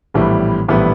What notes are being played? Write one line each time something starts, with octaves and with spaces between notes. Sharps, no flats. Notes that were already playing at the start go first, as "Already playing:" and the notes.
A#1 A2 E3 G3 B3
A#1 A2 E3 G3 B3